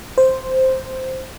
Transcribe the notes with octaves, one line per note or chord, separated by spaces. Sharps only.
C5